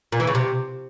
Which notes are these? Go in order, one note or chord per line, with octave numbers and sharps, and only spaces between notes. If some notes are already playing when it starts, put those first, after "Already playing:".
A#2
E3
C#3
C3